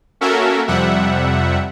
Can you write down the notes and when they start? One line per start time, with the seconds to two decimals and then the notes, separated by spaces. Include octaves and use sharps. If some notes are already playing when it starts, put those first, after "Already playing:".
0.21 A#3 C#4 F#4 A4 A#4 E5
0.67 F2 C3 G3 E5 F#5